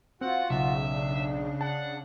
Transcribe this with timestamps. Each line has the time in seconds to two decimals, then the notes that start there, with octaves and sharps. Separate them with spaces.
0.21 C4 F4 F#4 F#5
0.50 B1 C#3 E5
0.88 D4
1.61 F#5 A5